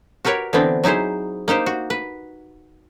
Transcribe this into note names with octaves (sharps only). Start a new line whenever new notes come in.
F#4 G4 A#4 B4 C#5
D3 E3 B3 C4 D4
F#3 D#4 E4 G#4 C5
A#3 D#4 G4 C5
F#4
B4